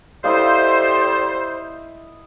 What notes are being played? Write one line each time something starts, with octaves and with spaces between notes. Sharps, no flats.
G3 E4 A4 C5 D#5 F5